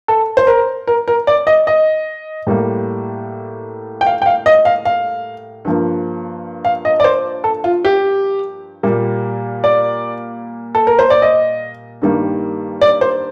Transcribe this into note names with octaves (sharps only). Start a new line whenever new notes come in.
A4
C5
A#4
A#4
A#4
D5
D#5
D#5
A2 G3 A#3
G5
F5
G5
F5
D#5
F5
F5
G2 F3 A#3
F5
D#5
D5
C5
A4
F4
G4
A#2 G3 A#3
D5
A4
A#4
C5
D5
D#5
G2 D#3 G3 A#3
D5
C5